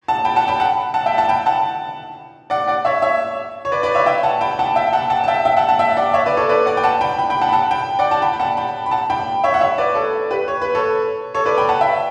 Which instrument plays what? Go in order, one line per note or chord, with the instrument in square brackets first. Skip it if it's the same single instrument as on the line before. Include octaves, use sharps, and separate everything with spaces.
[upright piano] F#5 A5
G5 B5
F#5 A5
G5 B5
F#5 A5
F#5 A5
E5 G5
F#5 A5
G5 B5
F#5 A5
D5 F#5
D5 F#5
C#5 E5
C#5 E5
C#5
B4 D5
B4 D5
C#5 E5
E5 G5
F#5 A5
G5 B5
F#5 A5
E5 G5
G5
F#5 A5
F#5 A5
A5
E5 G5
E5 G5
F#5 A5
F#5 A5
E5 G5
D5 F#5
C#5 E5
B4 D5
A4 C#5
B4 D5
D5 F#5
G5
F#5 A5
G5 B5
G5 B5
G5 B5
F#5 A5
B5
F#5 A5
G5 B5
D5 F#5
F#5 A5
G5 B5
B5
F#5 A5
G5 B5
B5
F#5 A5
G5 B5
C#5 E5
F#5
C#5 E5
B4 D5
A4 C#5
G4 B4
C#5
B4
A4 C#5
A4 C#5
B4 D5
G5 B5
F#5 A5
E5 G5